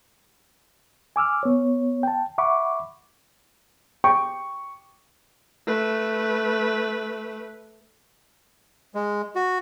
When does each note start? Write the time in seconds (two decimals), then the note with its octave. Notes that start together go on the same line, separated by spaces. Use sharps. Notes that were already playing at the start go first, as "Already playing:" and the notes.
1.16 G#5 D6 E6 F6
1.43 B3 C#5
2.03 G5 A5
2.38 E5 F#5 B5 C#6 D6
4.04 G5 C#6
5.67 A3 B4
8.95 G#3
9.35 F#4